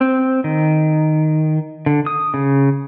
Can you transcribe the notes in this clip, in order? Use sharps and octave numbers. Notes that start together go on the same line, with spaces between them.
C4
D#3
D3
D#6
C#3